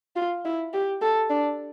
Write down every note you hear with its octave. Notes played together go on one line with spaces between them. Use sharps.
F4
E4
G4
A4
D4